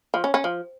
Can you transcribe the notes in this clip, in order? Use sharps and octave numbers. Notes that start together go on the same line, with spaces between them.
F3
C#4
C#4
F3